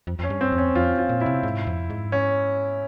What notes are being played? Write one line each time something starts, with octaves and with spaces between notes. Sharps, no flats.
F2
F2 C#4
G2
C4
F2
C#4
F2 F4
F4
A#2
C3 E4
G#2
F2
G#2
C#4